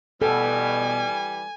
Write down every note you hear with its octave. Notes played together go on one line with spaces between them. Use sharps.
B2 E3 G3 A4 G#5